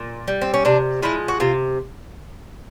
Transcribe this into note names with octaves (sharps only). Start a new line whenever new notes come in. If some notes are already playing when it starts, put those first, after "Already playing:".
Already playing: A#2
G3
C4
C#4
C3 D4
F3 G#3 E4
F#4
C3 F4